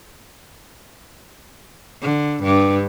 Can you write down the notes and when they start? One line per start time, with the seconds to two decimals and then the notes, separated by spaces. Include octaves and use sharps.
2.02 D3
2.43 G2